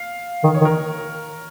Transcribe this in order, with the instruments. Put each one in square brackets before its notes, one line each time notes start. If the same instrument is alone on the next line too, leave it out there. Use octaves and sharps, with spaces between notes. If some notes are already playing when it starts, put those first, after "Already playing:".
Already playing: [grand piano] F5
[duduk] D#3
[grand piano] C#5
[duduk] D#3
[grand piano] A#4